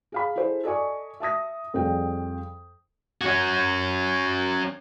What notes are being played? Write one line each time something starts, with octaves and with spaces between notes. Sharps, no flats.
G#4 F5 B5
E4 G#4 A4 C5
A4 D5 D#5 G#5 C#6
E5 A5 D#6 A#6
F2 G3 G#4 G5
C#4 F#4